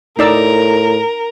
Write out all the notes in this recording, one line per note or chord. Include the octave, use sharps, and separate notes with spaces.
A2 D#4 A#4 D5 E6